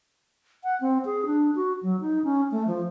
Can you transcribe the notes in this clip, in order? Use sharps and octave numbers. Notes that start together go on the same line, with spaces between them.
F#5
C4
G#4
D4
F#4
F#3
D#4
C#4
A3
F3